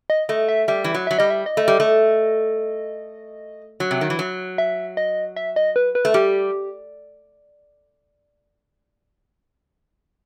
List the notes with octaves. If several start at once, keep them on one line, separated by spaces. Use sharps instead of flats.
D#5
A3 D#5
E5
G3 E5
E3
F#3
F#3 E5
G3 D#5
E5
D#5
A3
G3
A3
F#3
C3
D#3
E3
F#3
E5
D#5
E5
D#5
B4
B4
A3
G3 G4